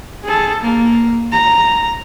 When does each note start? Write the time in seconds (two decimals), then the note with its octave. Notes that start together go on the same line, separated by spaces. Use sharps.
0.24 G#4 A4
0.60 A#3
1.32 A#5